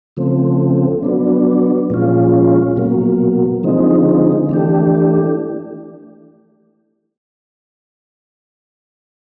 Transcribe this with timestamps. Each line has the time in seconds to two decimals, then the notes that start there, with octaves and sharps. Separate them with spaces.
0.17 C#3 F3 A3 C4
1.03 F#3 B3 D4
1.90 A#2 F3 G#3 C#4 F4
2.77 B2 F#3 A#3
3.63 D3 F3 G#3 C4 D#4
4.49 E3 A3 D4 G4